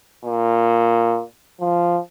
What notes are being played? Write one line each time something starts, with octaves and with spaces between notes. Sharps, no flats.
A#2
F3